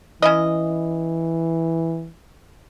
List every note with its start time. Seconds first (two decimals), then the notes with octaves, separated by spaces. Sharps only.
0.22 E3 C#4 E4 D#5